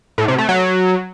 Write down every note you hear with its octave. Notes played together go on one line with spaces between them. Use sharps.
A2
C3
A3
F#3